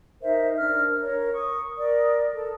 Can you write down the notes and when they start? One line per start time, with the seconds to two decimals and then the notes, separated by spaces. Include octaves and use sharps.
0.22 D#4 A#4 C5 E5
0.57 D4 A#4 F6
1.01 A#4 C#5
1.34 C#6 D#6
1.77 A#4 D5 D#6
2.34 A4